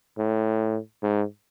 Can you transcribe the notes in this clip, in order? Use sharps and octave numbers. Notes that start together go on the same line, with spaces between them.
A2
G#2